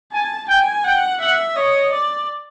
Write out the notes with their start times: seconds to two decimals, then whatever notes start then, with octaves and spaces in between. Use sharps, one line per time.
0.12 G#5 A5
0.48 G5 G#5
0.84 F#5 G5
1.20 E5 F#5
1.56 C#5 D#5
1.93 D5